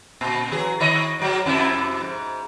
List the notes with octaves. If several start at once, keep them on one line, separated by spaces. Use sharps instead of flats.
A#2
E3 F#3 G#4
D#3 C#5 D#5
G#2 F#3
F2 C3 E4
G#2